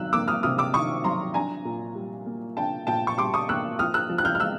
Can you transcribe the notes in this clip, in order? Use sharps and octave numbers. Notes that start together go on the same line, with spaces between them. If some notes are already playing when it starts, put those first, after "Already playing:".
Already playing: D#3 F#3 E6 F#6
A#3 D6 E6
D#6 F6
C3 D#6 F6
D6 E6
D#3 C#6 D#6
F#3 A#5 C6
D4 G#5 A#5
A#2
G3
A#3
D4 G5 A5
A#2 G5 A5
C#6
G3 C6 D6
C#6 D#6
A#3 E6 F#6
F3 D#6 F6
E6 F#6
F3
F#6
F6 G6
F6
G#3 E6 F#6